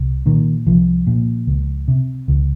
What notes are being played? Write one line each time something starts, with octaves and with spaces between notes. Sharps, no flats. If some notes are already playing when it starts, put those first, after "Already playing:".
Already playing: C2
A#2 D#3
C2 F3
A#2
C#2
C3
C#2